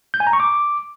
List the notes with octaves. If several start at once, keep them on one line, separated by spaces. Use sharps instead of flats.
G6
G#5
A#5
C#6
D6